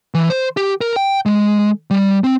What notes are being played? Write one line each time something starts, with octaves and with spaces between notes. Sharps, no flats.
E3
C5
G4
A#4
G5
G#3
G3
C4